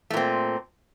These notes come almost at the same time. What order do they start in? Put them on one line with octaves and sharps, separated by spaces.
A3 A#2 C4